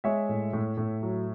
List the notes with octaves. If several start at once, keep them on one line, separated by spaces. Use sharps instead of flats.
G#3 C#5 E5
A2
A2
A2
F#3